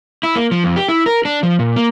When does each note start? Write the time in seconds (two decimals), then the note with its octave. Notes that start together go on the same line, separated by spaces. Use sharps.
0.23 E4
0.35 A#3
0.51 F3
0.64 F2
0.76 G4
0.88 E4
1.06 A#4
1.25 D4
1.43 F3
1.59 A#2
1.76 A#3